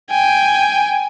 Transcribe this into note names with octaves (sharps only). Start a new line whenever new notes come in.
G5 G#5